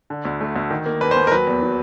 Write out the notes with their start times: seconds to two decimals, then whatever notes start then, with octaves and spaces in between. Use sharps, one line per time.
0.10 D3
0.25 D2
0.41 A3
0.56 D2
0.71 D#3
0.86 A#3
1.01 D#2 B4
1.11 C5
1.17 D#2
1.27 A#4
1.32 F#3 B4
1.47 E2
1.62 F#3